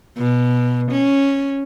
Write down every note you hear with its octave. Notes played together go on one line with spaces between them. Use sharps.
B2
C#4